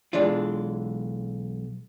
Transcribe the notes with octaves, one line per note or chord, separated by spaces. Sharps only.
B1 E3 G#3 D4 F4